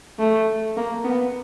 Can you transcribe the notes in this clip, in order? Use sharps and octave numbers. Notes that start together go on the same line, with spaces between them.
A3
A#3
B3